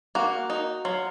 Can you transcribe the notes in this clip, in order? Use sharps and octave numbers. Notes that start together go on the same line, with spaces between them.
A#3 F#4
D#4
F#3 F4